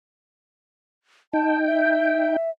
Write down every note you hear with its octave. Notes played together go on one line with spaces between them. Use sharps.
D#4 G5 A5
E5